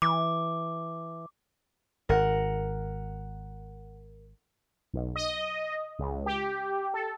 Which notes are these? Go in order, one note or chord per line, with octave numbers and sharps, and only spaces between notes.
E3 D6
G#1 A#4 F#5
B1
D#5
C#2
G4
A4